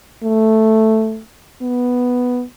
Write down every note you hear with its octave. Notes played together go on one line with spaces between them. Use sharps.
A3
B3